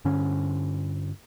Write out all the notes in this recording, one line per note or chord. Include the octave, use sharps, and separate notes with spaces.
G2 D3 C#4